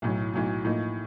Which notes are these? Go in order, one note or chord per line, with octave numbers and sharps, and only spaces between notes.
B1 A2 F#3
B1 A2 F#3
A2 F3 A#3 D#4